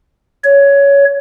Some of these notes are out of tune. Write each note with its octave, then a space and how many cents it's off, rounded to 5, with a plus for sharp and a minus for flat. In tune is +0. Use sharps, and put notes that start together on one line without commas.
C#5 +15